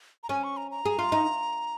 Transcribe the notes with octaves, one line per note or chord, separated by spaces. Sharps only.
A#5
C#4 G#5
C#6
A#5
A#5
G#4
F4
D#4